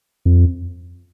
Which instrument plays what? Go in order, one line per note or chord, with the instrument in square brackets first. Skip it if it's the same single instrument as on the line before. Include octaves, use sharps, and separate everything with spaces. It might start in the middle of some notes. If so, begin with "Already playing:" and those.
[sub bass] F2